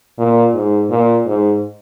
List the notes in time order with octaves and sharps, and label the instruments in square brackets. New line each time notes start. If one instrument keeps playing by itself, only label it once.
[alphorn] A#2
G#2
A#2
G#2